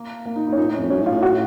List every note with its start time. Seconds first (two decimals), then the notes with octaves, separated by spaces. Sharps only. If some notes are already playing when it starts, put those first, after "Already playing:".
Already playing: A#3
0.26 A#3
0.36 D#4
0.47 D#4
0.52 C#4
0.58 A#2 D#4
0.69 A2
0.74 F2 C#4
0.90 F#2 C#4
1.01 A2
1.06 F4
1.12 A2
1.23 F#4